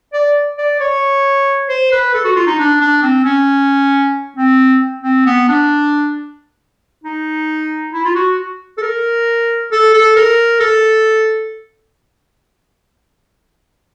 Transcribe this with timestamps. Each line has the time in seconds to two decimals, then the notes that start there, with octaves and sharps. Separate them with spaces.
0.13 D5
0.58 D5
0.80 C#5
1.69 C5
1.92 B4
2.14 A4
2.24 F#4
2.36 F4
2.47 D#4
2.59 D4
2.81 D4
3.03 C4
3.25 C#4
4.37 C4
5.03 C4
5.26 B3
5.48 D4
7.04 D#4
7.93 E4
8.05 F4
8.15 F#4
8.78 A4
8.82 A#4
9.72 A4
9.94 A4
10.16 A#4
10.60 A4